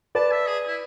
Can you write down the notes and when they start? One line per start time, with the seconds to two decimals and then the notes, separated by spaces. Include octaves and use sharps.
0.15 B4 D5 A5
0.32 E5
0.47 G#4
0.68 E4